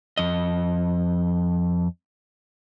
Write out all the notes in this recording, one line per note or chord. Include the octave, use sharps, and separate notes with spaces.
F2 D#5